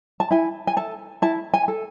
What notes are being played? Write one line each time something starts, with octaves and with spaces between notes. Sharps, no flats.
A5
E4 G#5
G#5
A4 A5
E4 A5
G#5
A4